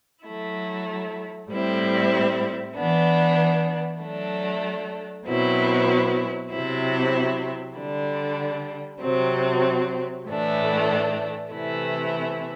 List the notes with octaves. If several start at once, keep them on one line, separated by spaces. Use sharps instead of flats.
F#3 A3 E4
A2 G3 C4 E4
E3 B3 D4
F#3 A3 D4
B2 F#3 C4 E4
C3 F#3 C4 E4
D3 G3 D4
C3 F#3 C4
A2 E3 A3 D4
C3 E3 A3 E4